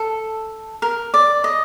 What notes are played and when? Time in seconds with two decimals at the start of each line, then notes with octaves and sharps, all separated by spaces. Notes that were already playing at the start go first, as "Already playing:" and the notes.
Already playing: A4
0.82 A#4
1.14 D5
1.44 D#5